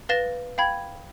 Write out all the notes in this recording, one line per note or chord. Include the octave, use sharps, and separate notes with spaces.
B4 F5 A6 A#6 E7 G7
F5 G5 B5 G#6